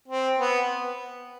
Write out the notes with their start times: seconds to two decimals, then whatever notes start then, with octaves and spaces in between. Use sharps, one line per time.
0.08 C4
0.39 B3